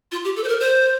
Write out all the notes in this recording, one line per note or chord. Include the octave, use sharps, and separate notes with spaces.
F4
G4
A4
C5
A#4
C5